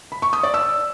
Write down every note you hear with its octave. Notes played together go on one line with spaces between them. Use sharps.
B5
C#6
D#6
D5
E6